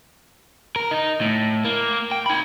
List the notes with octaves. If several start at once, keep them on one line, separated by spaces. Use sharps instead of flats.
A#4
D#4
A2
A#3
G5
D#4 B5